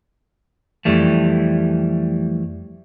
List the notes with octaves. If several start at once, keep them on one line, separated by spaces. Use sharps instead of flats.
F2 E3 G3 A3